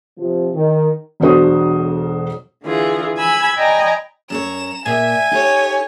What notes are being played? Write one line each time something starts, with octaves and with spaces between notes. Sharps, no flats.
C3 F3
D#3
E1 B1 D4 F#4 C5 D#6
D3 E3 F4 G#4
G#5 B5 E6 G#6
D5 D#5 G5 G#5 A#5 B5
F#2 A4 C#5 A#5 E7
A#2 E5 G#5
D#4 G4 A4 C#5